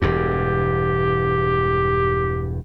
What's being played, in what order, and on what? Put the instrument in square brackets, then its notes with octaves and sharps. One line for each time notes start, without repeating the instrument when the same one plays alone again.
[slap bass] E1 E2 G2 [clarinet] G4